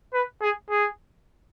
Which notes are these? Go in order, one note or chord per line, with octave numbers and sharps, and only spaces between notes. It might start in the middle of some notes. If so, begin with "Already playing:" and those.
B4
G#4
G#4